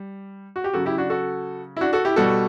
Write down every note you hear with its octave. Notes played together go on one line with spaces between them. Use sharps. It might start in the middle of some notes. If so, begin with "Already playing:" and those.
Already playing: G3
F#4
G4
C#3 F#3 F#4 A4
E4 G4
D4 F#4
F#4 A4
E4
D4 F#4
F#4 A4
E4 G4
B2 G3 F#4 A4